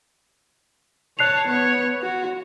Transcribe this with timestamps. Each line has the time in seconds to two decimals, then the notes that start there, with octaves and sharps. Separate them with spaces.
1.19 C#5 A5 F#6 C7 F7
1.48 B3 C#5
2.03 F#4